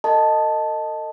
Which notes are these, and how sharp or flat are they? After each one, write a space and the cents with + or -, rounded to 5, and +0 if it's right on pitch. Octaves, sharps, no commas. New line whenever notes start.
A4 +40 D#5 +0 A5 +0